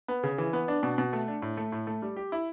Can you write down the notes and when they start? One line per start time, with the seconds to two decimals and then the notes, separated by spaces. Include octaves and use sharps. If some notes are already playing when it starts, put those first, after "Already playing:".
0.08 B3
0.23 C#3
0.38 E3
0.53 B3
0.68 D4
0.83 B2
0.98 B2
1.13 A3
1.28 D4
1.42 A2
1.57 A3
1.72 A2
1.87 A3
2.02 G3
2.17 G4
2.32 E4